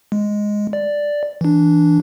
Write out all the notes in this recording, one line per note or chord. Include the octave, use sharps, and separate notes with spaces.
G#3
D5
E3 D4